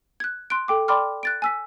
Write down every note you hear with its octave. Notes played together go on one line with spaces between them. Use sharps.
F#6 G#6
C6 F#6 D7
A4 G5 D6
D5 G5 B5 C6 D6 F6
F#6 A6 D7
G#5 E6 B6